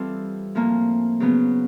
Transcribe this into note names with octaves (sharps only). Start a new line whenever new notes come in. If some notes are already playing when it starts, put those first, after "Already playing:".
Already playing: E3 G3 C4 F4 A4
A2 F3 A#3
C#3 F#3 B3